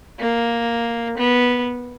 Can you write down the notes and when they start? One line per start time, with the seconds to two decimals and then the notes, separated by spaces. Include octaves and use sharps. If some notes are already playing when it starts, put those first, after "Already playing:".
0.19 A#3
1.17 B3